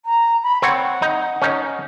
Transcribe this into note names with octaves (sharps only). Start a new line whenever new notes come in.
A#5
B5
C4 C#5 F#5
D#4
C#4 D#4